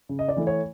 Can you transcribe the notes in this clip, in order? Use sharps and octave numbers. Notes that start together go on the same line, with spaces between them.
C#3
D#5
D5
E3 A3
C#5